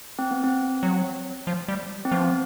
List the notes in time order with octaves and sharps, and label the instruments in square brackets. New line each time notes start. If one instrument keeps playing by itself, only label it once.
[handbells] C4
B3
C4
[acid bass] F#3
F3
G3
[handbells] C4
[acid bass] F3 [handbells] B3